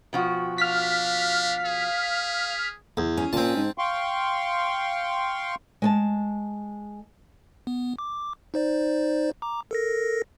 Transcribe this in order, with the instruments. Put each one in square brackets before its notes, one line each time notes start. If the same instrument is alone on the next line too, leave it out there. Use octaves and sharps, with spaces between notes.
[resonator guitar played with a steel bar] B2 F3 F#4 [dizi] G5
[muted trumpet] D4 [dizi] F5 [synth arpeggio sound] F6 B6
[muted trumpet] G#4
[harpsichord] E2
[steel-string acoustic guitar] C#4 G#4
[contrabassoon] A#2 [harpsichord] C4 A5
[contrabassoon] G#2
[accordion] F5 G5 C6 C#6
[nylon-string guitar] G#3 G#5 A5
[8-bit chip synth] B3
D6
D#4 C5 D5
A#5 D6
A4 A#4 A#6